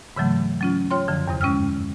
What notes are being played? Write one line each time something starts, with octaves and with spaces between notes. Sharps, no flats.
G#2 C#3 E3 F#3 A3
F#3 C#4 F4
F4 C#5 G5 C6
F#2 D3 F3
E2 G2 C3
G#3 C#4 G5 E6 F6